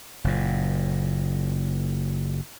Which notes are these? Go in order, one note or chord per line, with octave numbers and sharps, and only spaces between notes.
F#1 A#2